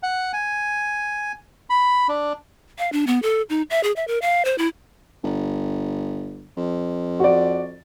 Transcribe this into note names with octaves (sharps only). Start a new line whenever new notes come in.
F#5
G#5
B5
D4
F5
D4
B3
A4
D#4
E5
G#4
E5
A#4
F5
C5
E4
G1
F2
F#4 D5